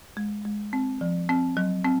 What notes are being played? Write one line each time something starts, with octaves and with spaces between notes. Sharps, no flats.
G#3
G#3
C4
F3
C4
F#3
C4